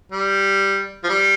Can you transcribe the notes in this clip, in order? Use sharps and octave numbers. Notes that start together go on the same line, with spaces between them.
G3
F3
G3